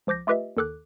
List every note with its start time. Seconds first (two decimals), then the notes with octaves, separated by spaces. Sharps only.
0.07 C#2 F3 D6 G6 A#6
0.27 A3 F4 G4 B4 D#5 E5
0.57 D#2 D#3 A4 D6 F#6